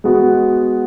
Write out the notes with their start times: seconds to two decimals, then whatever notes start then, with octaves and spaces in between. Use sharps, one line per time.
0.04 G#3 B3 F#4